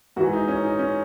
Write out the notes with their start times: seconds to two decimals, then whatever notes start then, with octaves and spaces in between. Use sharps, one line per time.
0.16 G#2 E3 F#4
0.33 D#4
0.48 C#4
0.64 D#4
0.79 C#4